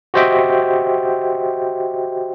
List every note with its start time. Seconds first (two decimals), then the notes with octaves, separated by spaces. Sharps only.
0.14 F#4 G4 C5 D#5 E5 G5